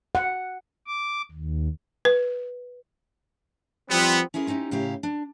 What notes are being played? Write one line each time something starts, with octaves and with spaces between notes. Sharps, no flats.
F#5
D6
D#2
B4
F3 G3 B3 C4
C#4 E4 G#4 A#4 B4
C4 C#4 D#4 F#4 G4
A2 C#3 E4 G4 F5 A#5
D4